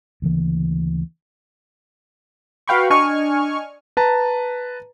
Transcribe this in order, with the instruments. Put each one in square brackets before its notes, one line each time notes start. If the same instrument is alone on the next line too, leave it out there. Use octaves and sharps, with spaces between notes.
[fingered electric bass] D2 C#3 E3 A#3
[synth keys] F#4 B4 F5 G5 B5 C#6
D4 D#5 G#5 C#6 F6
[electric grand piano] B4 A5 A#5